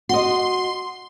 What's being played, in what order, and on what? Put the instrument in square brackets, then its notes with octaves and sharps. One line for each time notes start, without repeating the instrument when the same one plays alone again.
[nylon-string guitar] F#4 D#5 [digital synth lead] C6